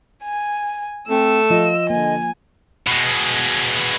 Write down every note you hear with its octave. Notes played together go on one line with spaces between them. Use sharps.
G#5
A3 C4 E6
F3 F4 D#5
D3 A#3 G#5
B2 G#3